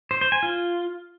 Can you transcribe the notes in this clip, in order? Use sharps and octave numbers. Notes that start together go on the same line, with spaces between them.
C5
C5
G#5
F4